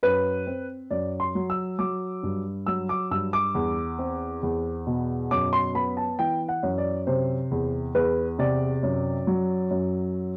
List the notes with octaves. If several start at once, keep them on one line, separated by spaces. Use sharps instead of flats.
F#2 B4
C4
F#2 D5
C6
F#3
E6
F#3 D6
G2
F#3 E6
D6
G2 E6
D6
E2
C4
E2
B2
F#2 D6
C6
B3 B5
A5
E3 G5
F#5
F#2
D5
C3 C5
E2
E2 B4
C3 D5
F#2
F#3
F#2